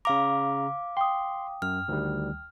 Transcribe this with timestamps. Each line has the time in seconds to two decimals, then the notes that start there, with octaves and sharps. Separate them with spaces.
0.05 C#3 F5 A#5 D6
0.97 G5 C6 D#6
1.62 F#2 F6
1.88 D2 D#3 G3